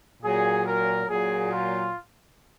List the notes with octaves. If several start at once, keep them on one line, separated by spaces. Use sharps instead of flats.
A#2 F#3 G#4
A#4
A#2 F#3 G#4
F4